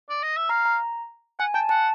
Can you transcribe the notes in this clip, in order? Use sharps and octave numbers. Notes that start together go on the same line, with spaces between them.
D5
D#5
E5
F5 A#5
A#5
F#5 G#5
G5 A5
F#5 A5